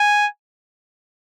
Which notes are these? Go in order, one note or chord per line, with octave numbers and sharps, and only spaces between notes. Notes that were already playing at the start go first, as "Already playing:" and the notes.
Already playing: G#5